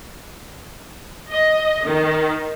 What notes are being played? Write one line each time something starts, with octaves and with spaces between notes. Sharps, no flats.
D#5
D#3